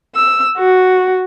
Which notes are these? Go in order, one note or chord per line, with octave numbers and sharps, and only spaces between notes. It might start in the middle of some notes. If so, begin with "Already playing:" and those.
E6
F#4